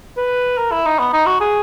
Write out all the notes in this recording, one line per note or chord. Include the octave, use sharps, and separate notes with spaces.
B4
A#4
E4
D#4
B3
D#4
F#4
G#4